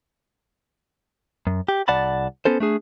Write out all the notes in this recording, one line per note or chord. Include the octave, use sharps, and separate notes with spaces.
F#2
G4
C2 D5 F#5 A5 B5
B3 C#4 A4 C5
A3 D4 G#4